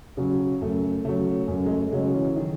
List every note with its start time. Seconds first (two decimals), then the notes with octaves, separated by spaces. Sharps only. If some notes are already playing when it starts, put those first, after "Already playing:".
0.17 C#3 F#3
0.61 F#2 A3
1.04 C#3 F#3 A3
1.48 F#2
1.66 G#3
1.70 A3
1.92 C#3 F#3 G#3
2.14 E3
2.36 D#3